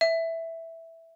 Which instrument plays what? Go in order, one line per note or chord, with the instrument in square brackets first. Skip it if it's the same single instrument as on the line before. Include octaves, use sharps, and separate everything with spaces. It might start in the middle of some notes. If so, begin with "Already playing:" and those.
[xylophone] E5